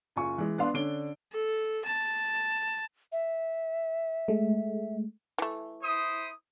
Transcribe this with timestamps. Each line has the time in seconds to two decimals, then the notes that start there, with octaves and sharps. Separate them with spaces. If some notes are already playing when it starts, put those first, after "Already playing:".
0.16 F#1 F4 G#5 C#6
0.38 E3 G#3
0.58 B3 D4 F5 C6
0.74 D3 C#4 D4 D7 G7
1.33 A4
1.85 A5
3.12 E5
4.28 G#3 A3
5.38 E3 A3
5.82 E4 C5 D#6